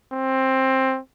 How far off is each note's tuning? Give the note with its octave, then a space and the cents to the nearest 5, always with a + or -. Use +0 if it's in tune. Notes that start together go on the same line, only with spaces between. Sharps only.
C4 +15